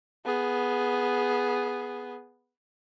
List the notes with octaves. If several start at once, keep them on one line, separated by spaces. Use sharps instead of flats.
B3 G#4